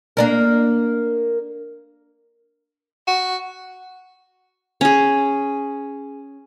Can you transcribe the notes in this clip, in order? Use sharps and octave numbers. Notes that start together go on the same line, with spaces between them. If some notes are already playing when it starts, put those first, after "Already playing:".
A#3 D4 A#4
F#4
C#4 G#4